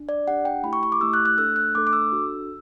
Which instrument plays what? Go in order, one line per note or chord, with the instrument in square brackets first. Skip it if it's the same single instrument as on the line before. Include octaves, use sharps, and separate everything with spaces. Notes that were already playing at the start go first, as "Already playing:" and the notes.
Already playing: [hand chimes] D4
D5
D4 G4 F#5
G5
A3 E4 G4 B5
C#6
C#6
D6
A3 E4 G4 E6
F#6
F#6
A3 D4 A4 E6
F#6
A3 D4 A4 D6
D6
E6
D4 F#4 A4